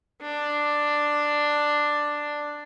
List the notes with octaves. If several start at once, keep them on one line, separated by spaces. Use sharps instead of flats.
D4